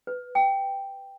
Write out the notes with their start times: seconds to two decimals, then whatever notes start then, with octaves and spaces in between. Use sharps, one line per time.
0.07 B4
0.35 G5